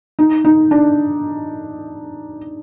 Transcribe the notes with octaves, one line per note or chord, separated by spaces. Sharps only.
D#4
D#4
D4